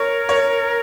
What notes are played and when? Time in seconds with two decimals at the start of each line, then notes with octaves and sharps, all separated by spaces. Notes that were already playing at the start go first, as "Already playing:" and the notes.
Already playing: A#4 C#5
0.29 C#5